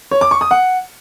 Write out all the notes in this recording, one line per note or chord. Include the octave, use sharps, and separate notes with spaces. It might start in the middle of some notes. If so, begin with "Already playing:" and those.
C#5
D6
C#6
D#6
F#5